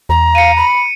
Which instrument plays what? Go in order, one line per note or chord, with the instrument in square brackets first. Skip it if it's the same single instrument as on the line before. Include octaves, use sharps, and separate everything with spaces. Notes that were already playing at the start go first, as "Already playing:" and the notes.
[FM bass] E2 [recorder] A#5
[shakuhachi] F5 [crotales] C#7 D#7
[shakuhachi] B5